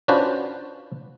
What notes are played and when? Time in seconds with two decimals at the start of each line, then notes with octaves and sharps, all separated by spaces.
0.08 C#4 D4 F4 F#4 B4 C5